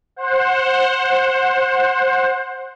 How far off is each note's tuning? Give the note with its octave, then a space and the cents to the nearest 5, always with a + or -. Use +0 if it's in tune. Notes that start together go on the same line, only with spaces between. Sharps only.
C5 +20 F#5 -10